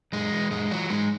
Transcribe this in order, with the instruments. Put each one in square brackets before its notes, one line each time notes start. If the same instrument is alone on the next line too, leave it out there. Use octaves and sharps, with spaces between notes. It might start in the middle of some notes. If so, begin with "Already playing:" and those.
[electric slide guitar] F#2 G#3
E3
F#2 G#3
E3 F#3
G#2 G#3